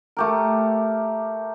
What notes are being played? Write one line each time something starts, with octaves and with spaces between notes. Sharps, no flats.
A3 G4 A#4